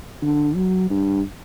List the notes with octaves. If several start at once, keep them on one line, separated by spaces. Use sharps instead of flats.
D3
F#3
G2